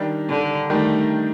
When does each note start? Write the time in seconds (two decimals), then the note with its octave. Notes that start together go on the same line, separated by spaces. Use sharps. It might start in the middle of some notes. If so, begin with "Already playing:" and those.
Already playing: D#3 G3 D4
0.28 D3
0.70 D#3 G3 A3 D4